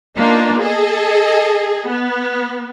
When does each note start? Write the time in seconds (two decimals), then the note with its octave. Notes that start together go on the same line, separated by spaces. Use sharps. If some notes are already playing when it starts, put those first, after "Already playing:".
0.16 A#3 B3 D4 D#4 F4
0.61 G#4 A4 D#5
1.87 B3